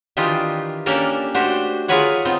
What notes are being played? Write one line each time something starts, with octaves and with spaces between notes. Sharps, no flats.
D#3 E3 D4 D#4 F4 G4
A#3 C#4 D4 G4 A4 A#4
A3 D4 F#4 G4 C5
F4 G#4 A#4 B4 C#5 F#5
B3 C4 D#4 F4